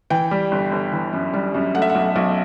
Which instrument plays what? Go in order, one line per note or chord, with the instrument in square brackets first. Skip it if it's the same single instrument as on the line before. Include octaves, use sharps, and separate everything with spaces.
[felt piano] E3 G5
G3
G1
G1
E3
F#2
G3
F#2
A3 F#5
E5
F#5
B1
B1